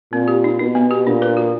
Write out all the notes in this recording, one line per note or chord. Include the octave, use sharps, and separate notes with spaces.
A#2 C4
G4
D#4
B2 D#4
B3
G4
A#2 D4
B4
F#4